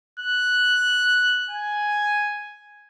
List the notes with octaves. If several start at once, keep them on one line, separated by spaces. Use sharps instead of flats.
F#6
G#5